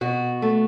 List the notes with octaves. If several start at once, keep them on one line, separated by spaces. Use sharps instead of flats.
B2 F#4
A3